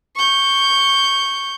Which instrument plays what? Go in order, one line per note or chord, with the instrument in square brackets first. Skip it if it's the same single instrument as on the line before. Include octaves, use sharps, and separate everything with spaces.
[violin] C#6 G6